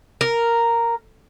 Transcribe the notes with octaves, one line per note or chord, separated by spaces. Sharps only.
A#4